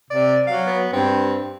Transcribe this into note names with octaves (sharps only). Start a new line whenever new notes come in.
C3 D5
F#3 F5
B3
G2 C4